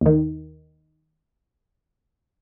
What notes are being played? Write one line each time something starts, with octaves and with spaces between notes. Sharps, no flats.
D#2 D#3